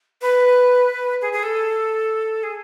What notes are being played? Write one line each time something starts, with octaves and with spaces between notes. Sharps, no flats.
B4
G#4
G#4
A4
G#4